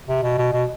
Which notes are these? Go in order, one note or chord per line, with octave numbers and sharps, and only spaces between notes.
C3
B2
B2
B2